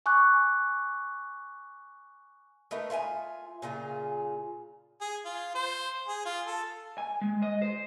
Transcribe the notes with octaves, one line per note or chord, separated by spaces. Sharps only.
G#5 C#6 D6 F#6
A3 D#4 A#4 B4
F4 E5 G5 G#5
A#2 C#3 F4 G#4
G#4
F4
C5
G#4
F4
A4
G#5
G#3
D#5
C5